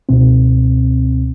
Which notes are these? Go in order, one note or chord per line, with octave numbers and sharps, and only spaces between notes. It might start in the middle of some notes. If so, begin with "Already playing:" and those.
C#2 B2 C4